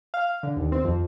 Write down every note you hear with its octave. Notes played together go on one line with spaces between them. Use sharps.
F5
D3
D#2
C4
F2